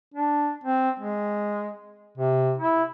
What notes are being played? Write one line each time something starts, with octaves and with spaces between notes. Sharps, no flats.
D4
C4
G#3
C3
E4